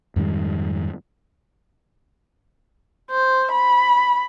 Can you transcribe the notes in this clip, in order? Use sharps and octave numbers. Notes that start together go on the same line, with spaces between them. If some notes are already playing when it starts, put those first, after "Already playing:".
F2 G#2 D#3 G3
C5
B5